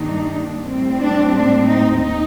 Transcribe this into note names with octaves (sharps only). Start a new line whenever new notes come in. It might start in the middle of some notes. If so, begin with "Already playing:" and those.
Already playing: G2 D#3 A#3 D4 D#4
A2 G3 C4
D4
D4
D#4
D#2 D#4